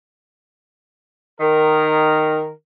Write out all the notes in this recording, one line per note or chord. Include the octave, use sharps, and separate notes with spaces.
D#3 A#4